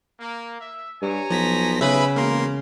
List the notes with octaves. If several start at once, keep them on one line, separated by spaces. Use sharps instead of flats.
A#3
E5
G2 C#5 G#5 A#5
B1 F3 A#6 B6
C#3 G#4 B4 E5 B5
E1 A#3 A#4 A#5 C6